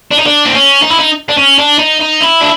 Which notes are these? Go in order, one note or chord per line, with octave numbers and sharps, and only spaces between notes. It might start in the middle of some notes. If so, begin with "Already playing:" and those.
D4
D#4
D4
C4
C#4
D#4
E4
D#4
D4
C#4
D4
D#4
D#4
E4
D4